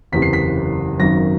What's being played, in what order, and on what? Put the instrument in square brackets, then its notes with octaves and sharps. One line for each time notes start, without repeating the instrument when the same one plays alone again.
[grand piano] F#1 E2 C3 B6
C7
B6
G#1 F#2 D#3 A#6